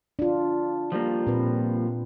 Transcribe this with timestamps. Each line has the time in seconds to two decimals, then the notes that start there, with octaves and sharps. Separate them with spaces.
0.19 D4 F4
0.92 F3 G3 A#3
1.27 A#2 C4 B4